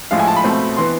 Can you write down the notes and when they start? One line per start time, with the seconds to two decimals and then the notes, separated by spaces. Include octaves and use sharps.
0.11 A2 F3 G#3 F5
0.19 G#5
0.27 A5
0.36 B5
0.44 B2 A3 C4
0.77 E3 B3 C6